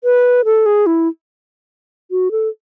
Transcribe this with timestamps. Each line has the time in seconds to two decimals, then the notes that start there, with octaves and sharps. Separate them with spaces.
0.04 B4
0.45 A4
0.66 G#4
0.86 E4
2.11 F#4
2.31 A4